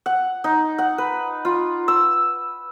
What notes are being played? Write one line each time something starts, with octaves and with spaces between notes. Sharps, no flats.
F#5
D#4
F#5
B4
F4
E6